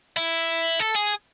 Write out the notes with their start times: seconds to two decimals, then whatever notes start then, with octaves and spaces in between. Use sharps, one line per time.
0.17 E4
0.80 A4
0.96 G#4